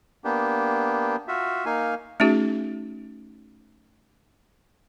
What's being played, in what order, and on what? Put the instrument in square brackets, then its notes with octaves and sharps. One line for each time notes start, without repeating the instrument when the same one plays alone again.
[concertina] A#3 B3 D4 G4
F4 F#4 E5
A#3 D#4 F5 G#5
[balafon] A3 C#4 D#4 F#4 G#4